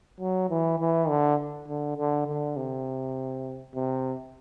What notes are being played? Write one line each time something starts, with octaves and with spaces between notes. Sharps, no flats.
F#3
E3
E3
D3
D3
D3
D3
C3
C3